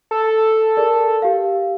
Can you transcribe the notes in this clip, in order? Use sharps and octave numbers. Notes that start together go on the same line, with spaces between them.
A4
G#4 A#4 D5
G4 F5